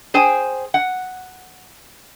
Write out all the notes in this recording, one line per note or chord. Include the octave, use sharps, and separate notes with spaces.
G#4 C5 G5 G#5
F#5